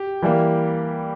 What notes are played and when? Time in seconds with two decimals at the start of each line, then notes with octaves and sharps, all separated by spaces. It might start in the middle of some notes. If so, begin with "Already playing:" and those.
Already playing: G4
0.22 E3 G3 A#3